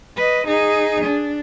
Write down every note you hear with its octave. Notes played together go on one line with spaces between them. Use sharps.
B4 D#5
D#4 G#4
D4